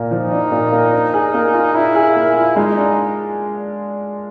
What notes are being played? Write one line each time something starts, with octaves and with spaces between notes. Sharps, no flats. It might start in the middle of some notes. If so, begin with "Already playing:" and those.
Already playing: A#2 A#3
F3 D#4
D4
A#2
A#3
D4
G#4
A#3
F4
D4 E4
G#4
A#3
F4
G#3 D#4
D4